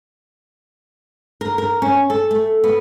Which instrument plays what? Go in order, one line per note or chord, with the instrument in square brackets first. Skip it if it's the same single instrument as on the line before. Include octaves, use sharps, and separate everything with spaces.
[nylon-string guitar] A#4
A#4
C#4
A4
A3
B3